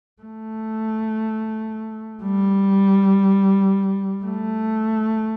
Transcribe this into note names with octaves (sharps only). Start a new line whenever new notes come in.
A3
G3
A3